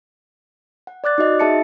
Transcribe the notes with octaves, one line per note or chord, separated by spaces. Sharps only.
F#5
D5 D6 F#6 A6
D#4 F#4 D#5
D#4 G#4 E5 A5 A6 C#7